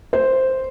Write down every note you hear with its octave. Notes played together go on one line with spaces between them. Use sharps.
C5